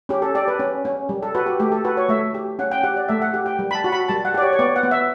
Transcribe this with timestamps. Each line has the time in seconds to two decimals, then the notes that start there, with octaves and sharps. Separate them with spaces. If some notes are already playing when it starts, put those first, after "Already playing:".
0.09 C#4 G4
0.22 A4
0.35 G4 D5
0.48 B4
0.59 C#4
0.85 C#4
1.09 G3
1.23 A4
1.35 F#4 B4
1.46 G4
1.60 A3 G4
1.72 A4
1.85 F#4 B4
1.97 C#5
2.09 A3 E5
2.34 G4
2.59 C#4 F#5
2.72 G5
2.83 G4 F#5
2.97 D5
3.08 A3 E5
3.22 F#5
3.34 G4
3.46 G5
3.59 G3
3.71 B5
3.75 A5
3.84 F#4
3.92 B5
4.08 G3 A5
4.25 F#5
4.34 G4 D5
4.42 C#5
4.53 C#5
4.59 B3 D5
4.76 F#5
4.83 B3
4.91 E5